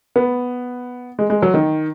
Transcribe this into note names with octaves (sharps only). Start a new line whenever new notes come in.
B3
G#3
G#3
F#3
D#3